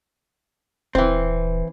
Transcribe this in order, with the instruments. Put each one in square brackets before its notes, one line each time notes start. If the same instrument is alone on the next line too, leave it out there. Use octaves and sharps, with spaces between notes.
[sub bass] D#1 [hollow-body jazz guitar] E3 C4